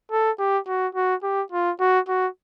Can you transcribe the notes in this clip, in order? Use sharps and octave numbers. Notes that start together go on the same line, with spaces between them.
A4
G4
F#4
F#4
G4
F4
F#4
F#4